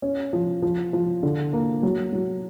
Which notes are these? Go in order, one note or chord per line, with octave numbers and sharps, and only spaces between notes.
C#4
F3
F3
F3
D3
A#3
F#3
F#3